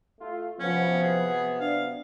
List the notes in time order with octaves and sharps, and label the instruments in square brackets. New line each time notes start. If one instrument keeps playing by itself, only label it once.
[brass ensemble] A3 F4
[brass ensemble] C3 F#3 B3 [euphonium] F3 [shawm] C#4
[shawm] G#4
[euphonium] D4 [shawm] F5